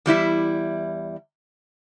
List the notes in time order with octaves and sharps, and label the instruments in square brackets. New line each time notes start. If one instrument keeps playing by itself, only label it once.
[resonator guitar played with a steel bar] E2 G3 E4 E5